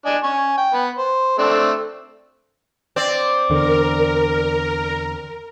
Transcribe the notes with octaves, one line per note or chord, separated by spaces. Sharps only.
D4 D#5 G#5
G#5 C#6
G5
B3
C5
A3 C4 D4
C4 D5
E2 D3 A#4